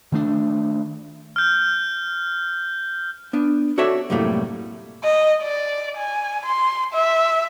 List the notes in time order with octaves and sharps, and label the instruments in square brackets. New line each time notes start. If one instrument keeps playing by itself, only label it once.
[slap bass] D#3 A3 D4
[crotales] F6 G6
[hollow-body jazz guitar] B3 D4
F#4 A4 C#5 D5 E5
C2 F#2 A2 G3 A3 A#3
[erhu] D#5
D5
G#5
C6
E5